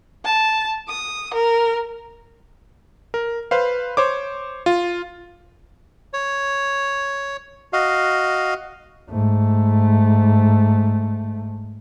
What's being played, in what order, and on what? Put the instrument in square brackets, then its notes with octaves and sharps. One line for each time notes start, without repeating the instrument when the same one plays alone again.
[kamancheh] A5
D#6
A#4
[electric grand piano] A#4
B4 C5 F5
C5 C#5 D6
F4
[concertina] C#5
F#4 D#5 F5
[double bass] G#2 A3